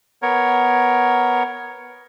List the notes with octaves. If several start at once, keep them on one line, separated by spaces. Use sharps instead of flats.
B3 A#4 C#5